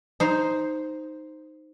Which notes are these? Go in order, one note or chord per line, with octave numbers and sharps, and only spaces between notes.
D#4 C5